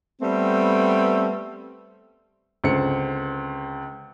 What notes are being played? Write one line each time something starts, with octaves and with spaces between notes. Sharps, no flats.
G3 A3 B3 C4
C#2 D3 C4 C#7